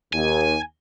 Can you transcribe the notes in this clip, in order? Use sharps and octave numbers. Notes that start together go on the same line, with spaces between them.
D#2 G#5